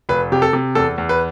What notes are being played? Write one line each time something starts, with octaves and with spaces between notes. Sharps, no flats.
F1 B4
C3 G4
A4
C3
E2 A4
E2
B4